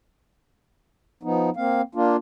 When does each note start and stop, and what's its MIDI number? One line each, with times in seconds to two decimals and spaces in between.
1.23 1.50 53
1.23 1.50 59
1.23 1.50 63
1.57 1.81 58
1.57 1.81 60
1.57 1.81 77
1.95 2.16 58
1.95 2.16 62
1.95 2.16 65